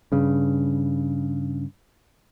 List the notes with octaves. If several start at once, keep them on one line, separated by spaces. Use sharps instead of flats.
G2 C#3